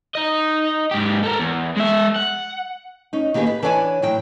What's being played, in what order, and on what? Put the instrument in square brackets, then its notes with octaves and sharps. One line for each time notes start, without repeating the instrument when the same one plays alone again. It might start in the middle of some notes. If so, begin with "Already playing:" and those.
[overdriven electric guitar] D#4 D#5
G#2 G4
A4 A#4
E2
G#3 E5
F#5
[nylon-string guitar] C#4 D#4
D#3 A#3 B3 G4 G#4
B4
E3 D4 C#5 D5 F#5 G#5
A2 F#3 G5